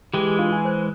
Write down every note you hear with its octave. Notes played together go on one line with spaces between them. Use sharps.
E3 G#3 G4 G#4
D4 F4 B4
G#5
C5 F#6